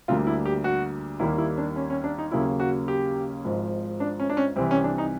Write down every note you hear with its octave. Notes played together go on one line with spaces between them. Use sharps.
D2 D3 G3 A#3 F4
E4
G4
F#4
D#2 D#3 G3 A#3 E4
E4
D4
C#4
C#4
D4
D#4
D#2 C#3 F#3 A#3 E4
F#4
G4
G#1 G#2 F3
D4
C#4
D4
C#4
C2 C3 E3 C4
C#4
D4
D#4